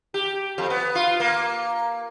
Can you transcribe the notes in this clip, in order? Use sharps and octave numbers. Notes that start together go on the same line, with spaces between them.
G4
F2
B3
F4
A#3